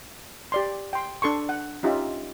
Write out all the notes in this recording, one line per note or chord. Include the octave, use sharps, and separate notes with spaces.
G4 D5 C6
G5 C6
D4 A4 C6 C#6
F#5
C#4 D#4 F4 G4 E5